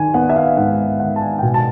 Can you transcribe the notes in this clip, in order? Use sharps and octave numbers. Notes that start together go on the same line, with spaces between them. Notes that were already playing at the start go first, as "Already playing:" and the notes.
Already playing: D#3 G#5
B3 F#5
E5
F5
G#2 F#5
D#3 F#5
A5
G#5
G5
B2 G#5
A5